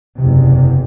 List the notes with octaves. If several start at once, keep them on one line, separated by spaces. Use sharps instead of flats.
F#1 E2 C3